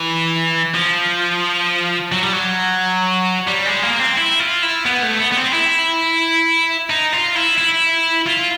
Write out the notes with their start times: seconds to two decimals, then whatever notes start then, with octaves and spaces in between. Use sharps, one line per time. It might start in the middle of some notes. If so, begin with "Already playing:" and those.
Already playing: E3
0.74 F3
2.12 F#3
2.22 G3
2.33 F#3
3.48 G3
3.66 G#3
3.82 A#3
4.00 C4
4.17 E4
4.39 F4
4.63 E4
4.86 B3
5.03 A3
5.20 B3
5.31 B3
5.37 C4
5.53 E4
6.90 D#4
7.13 F4
7.35 E4
7.58 E4
8.27 F4